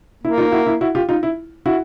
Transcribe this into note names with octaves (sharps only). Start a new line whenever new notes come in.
A#3 E4
D#4 F4
E4 F#4
E4
E4 F#4
F4 G4
D#4 F4
E4
E4 F#4